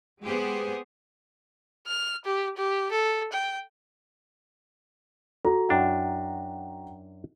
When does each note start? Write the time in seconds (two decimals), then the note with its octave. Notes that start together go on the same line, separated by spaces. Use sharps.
0.24 G#3 B3 G4 G#4 C5
1.87 F6
2.25 G4
2.57 G4
2.91 A4
3.32 G5
5.45 F#4 A4 A#5
5.69 F#2 D4 E4 F#5 G5